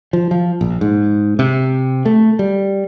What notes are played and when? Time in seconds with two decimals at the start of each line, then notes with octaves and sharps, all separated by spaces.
0.13 F3
0.31 F3
0.61 A#1
0.81 G#2
1.39 C3
2.05 A3
2.39 G3